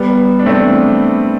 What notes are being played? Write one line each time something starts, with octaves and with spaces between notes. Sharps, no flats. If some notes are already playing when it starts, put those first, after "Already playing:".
Already playing: G3 B3
D4
A3 C4